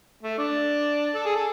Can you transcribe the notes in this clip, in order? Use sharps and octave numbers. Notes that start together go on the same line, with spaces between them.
A3
D4
A4
G#4
A4